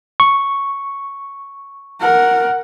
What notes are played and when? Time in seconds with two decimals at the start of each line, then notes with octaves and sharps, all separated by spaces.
0.20 C#6
2.01 A#4 F#5